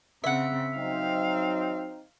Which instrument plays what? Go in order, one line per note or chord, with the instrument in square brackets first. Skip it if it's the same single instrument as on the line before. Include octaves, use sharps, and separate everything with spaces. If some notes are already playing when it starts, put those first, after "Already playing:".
[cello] C#3 C4 [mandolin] E5 F#5
[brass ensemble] F#3 C4 D#4 [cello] F5